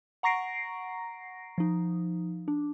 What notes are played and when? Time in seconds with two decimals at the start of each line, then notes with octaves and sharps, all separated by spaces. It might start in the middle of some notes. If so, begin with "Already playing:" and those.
0.23 F#5 A#5 C#6 A#6 C7 D7
1.58 F3 D#4
2.48 D4